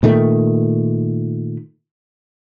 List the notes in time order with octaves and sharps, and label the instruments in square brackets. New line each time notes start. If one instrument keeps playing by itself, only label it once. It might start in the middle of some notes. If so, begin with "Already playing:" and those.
[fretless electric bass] A#2 D#3 A3